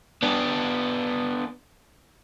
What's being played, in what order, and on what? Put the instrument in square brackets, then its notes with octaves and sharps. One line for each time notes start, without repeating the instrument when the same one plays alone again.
[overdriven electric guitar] B3 D4